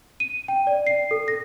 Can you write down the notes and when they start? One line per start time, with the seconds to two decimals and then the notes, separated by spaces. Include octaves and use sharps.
0.20 D#7
0.48 G5
0.67 D5
0.87 C7
1.11 A4
1.28 A#6